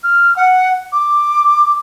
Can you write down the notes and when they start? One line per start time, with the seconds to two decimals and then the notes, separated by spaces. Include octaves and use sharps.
0.03 F6
0.37 F#5
0.92 D6